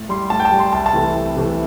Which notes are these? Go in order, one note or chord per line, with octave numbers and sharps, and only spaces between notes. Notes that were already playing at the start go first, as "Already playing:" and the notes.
Already playing: A2
G3 C6
A2 A5
G5
A5
G3
C6
C2 A5
A5
C3 E3 A3
C2
C3 E3 A3